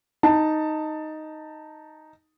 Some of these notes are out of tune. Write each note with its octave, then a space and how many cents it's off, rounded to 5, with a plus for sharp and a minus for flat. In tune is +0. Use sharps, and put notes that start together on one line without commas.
D#4 +0 A5 +15